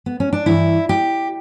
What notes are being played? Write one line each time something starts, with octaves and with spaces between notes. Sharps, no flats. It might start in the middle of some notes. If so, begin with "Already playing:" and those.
B3
C#4
D4
G2 E3 E4
G4